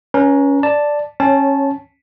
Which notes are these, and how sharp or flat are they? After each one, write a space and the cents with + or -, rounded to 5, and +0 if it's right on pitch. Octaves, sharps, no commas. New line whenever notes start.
C#4 +10 B4 -30 A#5 +0
D5 +0 A5 +0
C#4 -20 C#5 +0 A5 -15